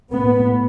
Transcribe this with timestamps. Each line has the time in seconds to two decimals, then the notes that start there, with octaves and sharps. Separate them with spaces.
0.13 A2 B3